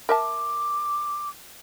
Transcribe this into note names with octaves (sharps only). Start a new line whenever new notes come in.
A#4 E5 A5 D6